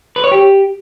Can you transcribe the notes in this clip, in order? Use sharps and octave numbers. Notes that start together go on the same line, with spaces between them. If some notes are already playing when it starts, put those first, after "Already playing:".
B4
C#5
G4